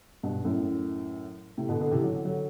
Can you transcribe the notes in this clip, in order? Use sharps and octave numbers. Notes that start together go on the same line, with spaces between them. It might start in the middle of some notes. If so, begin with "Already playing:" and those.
G2 B2
F#2 A2
A2 C3
B2 D3
B2 D3
C3 E3
D3 F#3
D3 F#3